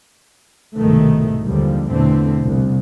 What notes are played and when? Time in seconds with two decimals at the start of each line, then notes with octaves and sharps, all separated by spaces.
0.76 C2 G#2 B2 D#3 A3
1.44 D#2 G#2 D3 F3 G3
1.89 E2 B2 D3 A3 C4
2.43 C2